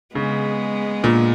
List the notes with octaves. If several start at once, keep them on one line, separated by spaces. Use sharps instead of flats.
C#3 G#3 B3
A#2